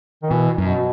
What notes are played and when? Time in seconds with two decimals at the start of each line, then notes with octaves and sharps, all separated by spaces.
0.23 D#3
0.31 B2 E3
0.58 F#2 B2